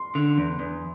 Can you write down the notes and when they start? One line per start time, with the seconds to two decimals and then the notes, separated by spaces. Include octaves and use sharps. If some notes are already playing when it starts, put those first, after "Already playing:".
Already playing: C6
0.15 D3
0.38 E2
0.60 E2